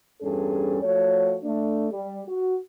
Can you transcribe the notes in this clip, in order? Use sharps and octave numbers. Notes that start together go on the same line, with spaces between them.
E2 G2 G3 C#4 G#4 A4
F3 A3 F#4 C#5
A3 D4
G3
F#4